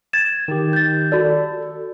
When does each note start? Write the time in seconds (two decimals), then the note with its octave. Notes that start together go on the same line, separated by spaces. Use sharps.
0.13 G#6 A6 E7
0.48 D#3 G4
0.73 G6 A6
1.12 F#4 A4 D5